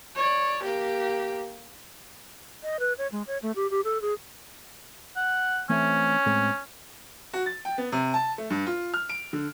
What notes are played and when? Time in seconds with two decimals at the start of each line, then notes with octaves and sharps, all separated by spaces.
0.15 C#5 D5
0.63 A#3 G4
2.63 D#5
2.80 B4
2.98 C#5
3.12 G#3
3.27 C#5
3.42 A3
3.56 G4
3.71 G4
3.84 A4
4.02 G#4
5.16 F#5
5.69 E3 A3 C4 C#4
6.26 A2 G#3 C4
7.33 F#4
7.46 A6
7.65 G5
7.78 B3
7.92 C3
8.14 A5
8.38 A3
8.50 G2
8.67 F4
8.94 F6
9.09 D7
9.33 D3